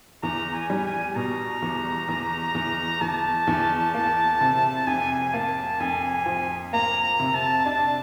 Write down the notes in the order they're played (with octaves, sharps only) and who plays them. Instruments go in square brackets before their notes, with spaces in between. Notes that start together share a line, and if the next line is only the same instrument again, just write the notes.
[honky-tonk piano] E2 [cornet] A#5
[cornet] G#5
[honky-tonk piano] G3
[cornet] G#5
[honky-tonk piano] B2 [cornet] A#5
[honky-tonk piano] E2
E2
E2
[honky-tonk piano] E2 [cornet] A5
[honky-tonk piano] E2
A#3
C3
[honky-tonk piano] F2 [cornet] G#5
[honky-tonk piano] A#3 [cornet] A5
[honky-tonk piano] F2 [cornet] G#5
[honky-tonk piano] F3
[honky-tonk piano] A#3 [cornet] A#5
[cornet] A#5
[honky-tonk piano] C3
[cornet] A5
[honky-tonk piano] D4 [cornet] A5